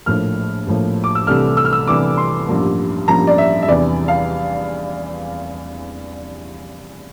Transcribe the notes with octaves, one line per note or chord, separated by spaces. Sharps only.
A#1 A2 F3 A#3 F6
A#1 A2 F3 A#3
D6
E6
C2 C3 E3 A3 D4 F6
E6
F6
E6
C2 C3 E3 A3 D4 D6
C6
A1 G2 F3 A#3
A1 G2 F3 A#3 A#5
D5
E5
E5
E2 C3 E3 G3 D4 D5
F5